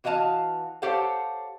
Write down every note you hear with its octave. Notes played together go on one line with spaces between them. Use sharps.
E3 F#4 D#5 F5 A5
G4 A4 C5 C#5 F5 F#5